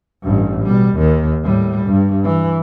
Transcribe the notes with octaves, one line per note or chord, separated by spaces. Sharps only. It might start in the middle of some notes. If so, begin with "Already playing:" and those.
A1 G2
B2 G3
D#2 D#3
A2 G3
G2
E3